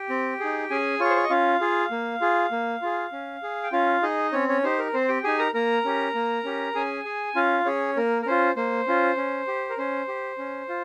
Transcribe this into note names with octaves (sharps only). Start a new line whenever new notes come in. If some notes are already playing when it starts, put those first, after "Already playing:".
Already playing: G4 G5
C4
D#4 G#4
C#4 G#4 G#5
F4 G#4 C#5 C#6
C5
C#5
D#5
C#4 F4 F5
F4 G#4
A#3
F4 G#4
A#3
F4 G#4
C#4
G#4
G5
C#4 F4 F5
D#4 G#4 D#5
C4 C#4 C#5
C#4 C#5
D#4 G4 C5
A#4
C4 C5
G4 G5
D#4 G4 G#4 G#5
A#4 A#5
A#3 A#4 A#5
C#4 G4
A#3
C#4 G4
C#4 G#4 G#5
G#4
C#4 F4 F5
C#4 G#4 C#5
A#3 A#4
A#4
C#4 F4 C5
A#3 C5
C#4 F4
C#4
G4
A#4
C#4 C5
G4
C#4
F4